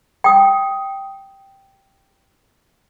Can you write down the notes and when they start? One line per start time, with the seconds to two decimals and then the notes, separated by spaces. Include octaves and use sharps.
0.24 G5 D#6